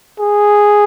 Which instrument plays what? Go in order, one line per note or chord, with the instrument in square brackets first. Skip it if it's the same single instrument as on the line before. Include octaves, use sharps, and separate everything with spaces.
[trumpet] G#4